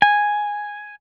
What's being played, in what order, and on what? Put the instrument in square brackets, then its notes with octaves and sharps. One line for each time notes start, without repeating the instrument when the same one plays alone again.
[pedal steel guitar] G#5